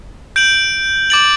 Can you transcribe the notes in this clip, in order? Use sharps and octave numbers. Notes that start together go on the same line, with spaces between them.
G6 D7 F#7
D6 A6 D7 F#7